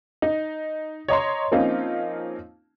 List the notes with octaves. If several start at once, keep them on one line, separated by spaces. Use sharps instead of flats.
D#4
C#5 D#5 A#5 C6
F3 A#3 C4 C#4 D#4 F4